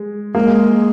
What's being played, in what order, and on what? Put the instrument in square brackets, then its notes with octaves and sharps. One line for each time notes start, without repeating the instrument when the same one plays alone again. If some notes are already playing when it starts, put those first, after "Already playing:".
Already playing: [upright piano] G#3
[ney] G#3 [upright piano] A#3